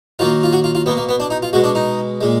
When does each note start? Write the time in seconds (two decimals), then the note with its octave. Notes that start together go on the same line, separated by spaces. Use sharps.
0.19 D#3 F#3 A#3 F4
0.43 F4
0.53 F#4
0.64 F4
0.75 F4
0.86 B2 A#3 B3
0.97 A#3
1.09 B3
1.20 D4
1.30 D#4
1.43 F4
1.53 B2 G#3 F#4
1.64 D4
1.75 D#4
2.21 A#2 G#3